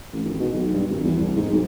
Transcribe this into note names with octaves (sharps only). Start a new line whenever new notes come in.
A1
G#1
B2
B1
G2
G#1
E2
C2
G#2
B1